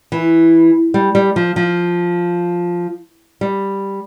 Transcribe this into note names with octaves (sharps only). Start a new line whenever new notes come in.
E3
G3
G3
F3
F3
G3